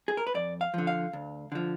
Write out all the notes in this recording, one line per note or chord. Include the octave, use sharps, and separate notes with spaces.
G#4
A#4
B4
F2 D5
F5
D3 F3
F5
D2
D3 F3